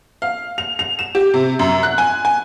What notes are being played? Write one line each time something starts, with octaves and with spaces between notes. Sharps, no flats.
F5
F7
F7
E7
G4
C3
F#2
F#6
G#5
G#5